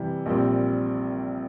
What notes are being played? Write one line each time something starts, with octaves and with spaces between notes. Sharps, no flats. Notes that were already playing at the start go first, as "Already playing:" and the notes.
Already playing: C3 E3 G3
A#1 A#2 G3 C4